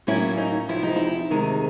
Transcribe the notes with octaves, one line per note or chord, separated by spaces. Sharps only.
A2 F#3 A#3 C#4 E4
D#4
E2 C3 F3 E4
D#4
E4
D2 C3 D#3 G#3